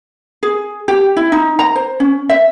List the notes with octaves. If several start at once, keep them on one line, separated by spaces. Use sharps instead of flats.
G#4
G4
E4
D#4
A#5
C5
C#4
E5